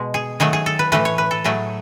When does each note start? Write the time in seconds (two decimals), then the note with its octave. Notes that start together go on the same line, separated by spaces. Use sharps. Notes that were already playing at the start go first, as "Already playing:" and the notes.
Already playing: B2 G#3
0.14 G#4
0.40 D#3 F#3 A3 G#4
0.53 G#4
0.66 A4
0.79 B4
0.92 A2 E3 A3 B4
1.05 C#5
1.18 B4
1.31 A4
1.44 A2 F#3 A3 G#4